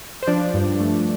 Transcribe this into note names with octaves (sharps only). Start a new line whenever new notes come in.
C5
F3 D4 D5
G2
A3